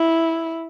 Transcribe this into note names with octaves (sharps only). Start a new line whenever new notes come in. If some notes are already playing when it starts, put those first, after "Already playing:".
Already playing: E4